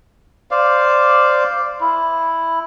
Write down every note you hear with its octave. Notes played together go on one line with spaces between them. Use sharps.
C5 D5 F5
E4